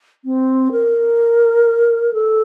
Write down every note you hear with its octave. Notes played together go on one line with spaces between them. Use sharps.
C4
A#4
A4